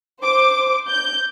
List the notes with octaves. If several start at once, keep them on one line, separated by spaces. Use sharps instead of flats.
C5 D6
G6